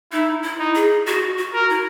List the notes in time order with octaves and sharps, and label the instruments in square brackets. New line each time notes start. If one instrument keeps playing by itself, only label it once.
[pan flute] D#4 [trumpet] E4
[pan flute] E4
[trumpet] D#4
[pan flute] G#4
F#4
F#4
[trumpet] A#4
[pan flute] E4